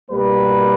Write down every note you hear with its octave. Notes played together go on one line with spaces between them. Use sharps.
C2 B2 G3 A#3 B4